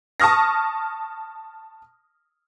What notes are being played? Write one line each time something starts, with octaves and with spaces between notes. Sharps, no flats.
A5 C#6 D#6 F6 A#6